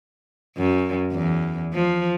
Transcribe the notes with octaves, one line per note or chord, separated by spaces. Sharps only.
F#2
E2
F3